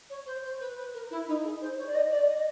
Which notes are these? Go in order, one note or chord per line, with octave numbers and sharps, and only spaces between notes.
C#5
C5
C5
B4
B4
A#4
E4
D#4
G#4
C5
C5
C#5
D5
D#5
D5
D#5